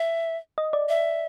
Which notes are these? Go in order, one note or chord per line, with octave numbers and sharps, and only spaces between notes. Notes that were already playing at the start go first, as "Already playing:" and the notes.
Already playing: E5
D#5
D5
E5